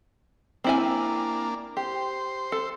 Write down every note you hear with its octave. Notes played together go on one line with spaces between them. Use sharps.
A#3 C4 D4 E4 G#5
G4 C5
A4